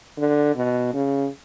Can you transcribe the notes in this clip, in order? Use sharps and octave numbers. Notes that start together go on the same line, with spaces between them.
D3
B2
C#3